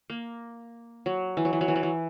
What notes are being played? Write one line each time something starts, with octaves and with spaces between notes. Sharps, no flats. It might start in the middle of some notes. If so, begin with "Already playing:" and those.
A#3
F#3
E3
F#3
E3
F#3
E3
F#3
E3